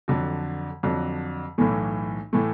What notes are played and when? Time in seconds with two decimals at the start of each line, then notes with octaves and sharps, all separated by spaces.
0.08 F2 D3 F#3
0.83 F2 D3 F#3
1.58 B1 A2 E3 A3
2.33 A2 E3 A3